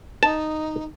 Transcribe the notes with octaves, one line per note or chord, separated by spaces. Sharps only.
D#4 A5